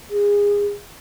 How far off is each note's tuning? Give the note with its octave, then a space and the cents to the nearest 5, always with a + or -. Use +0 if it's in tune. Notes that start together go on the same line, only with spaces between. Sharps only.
G#4 -25